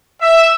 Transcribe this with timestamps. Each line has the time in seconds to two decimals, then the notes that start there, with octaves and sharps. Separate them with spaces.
0.22 E5